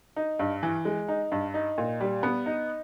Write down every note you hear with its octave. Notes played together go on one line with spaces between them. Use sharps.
D#4
G2
E3
G#3
D#4
G2
D#4
A#2
G3
B3
D#4